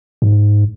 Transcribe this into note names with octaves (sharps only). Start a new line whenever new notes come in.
G#2